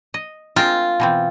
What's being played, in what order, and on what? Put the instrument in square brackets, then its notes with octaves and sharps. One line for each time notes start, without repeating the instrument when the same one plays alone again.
[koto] D#5
[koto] G#3 C4 A#4 [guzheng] F4
[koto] B2 E3 C4